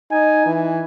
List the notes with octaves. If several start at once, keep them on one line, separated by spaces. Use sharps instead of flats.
D#4 G#5
E3